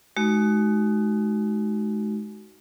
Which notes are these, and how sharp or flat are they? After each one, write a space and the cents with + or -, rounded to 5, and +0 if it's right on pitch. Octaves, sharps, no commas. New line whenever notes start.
G#3 +35 D#4 +0 F#4 +25